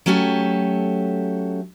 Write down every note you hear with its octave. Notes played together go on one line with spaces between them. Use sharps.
F#3 A3 C#4 G4 A4